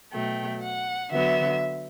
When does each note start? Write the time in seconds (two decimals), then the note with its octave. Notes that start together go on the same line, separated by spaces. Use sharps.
0.12 B2 F#3 A3 G5
0.61 F#5
1.10 D3 F#3 B3 E5